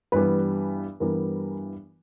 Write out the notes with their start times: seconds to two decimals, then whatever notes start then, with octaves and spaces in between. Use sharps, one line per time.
0.12 G2 E3 G3 B3 B4
1.00 G2 E3 G3 B3 A#4